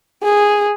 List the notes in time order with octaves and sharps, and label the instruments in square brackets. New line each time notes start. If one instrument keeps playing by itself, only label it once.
[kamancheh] G#4